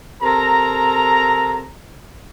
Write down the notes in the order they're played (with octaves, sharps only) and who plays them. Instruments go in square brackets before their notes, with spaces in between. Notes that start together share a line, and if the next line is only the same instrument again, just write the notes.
[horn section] C3 A4 A#4 A#5